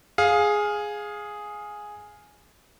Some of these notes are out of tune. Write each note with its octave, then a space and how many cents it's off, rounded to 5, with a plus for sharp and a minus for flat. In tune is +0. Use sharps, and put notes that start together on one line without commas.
G#4 +0 F5 +15